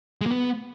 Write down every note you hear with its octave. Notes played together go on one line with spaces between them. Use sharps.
G#3
A#3
B3